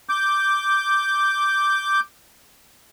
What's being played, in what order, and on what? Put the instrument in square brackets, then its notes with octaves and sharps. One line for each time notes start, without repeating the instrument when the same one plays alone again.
[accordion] D6 G6